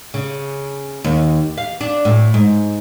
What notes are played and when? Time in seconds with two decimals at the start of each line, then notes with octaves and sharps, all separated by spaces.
0.14 C#3
1.04 D#2
1.58 F5
1.81 D4
2.05 A2
2.34 G#2